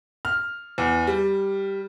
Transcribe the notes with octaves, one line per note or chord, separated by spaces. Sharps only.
F6
E2
G3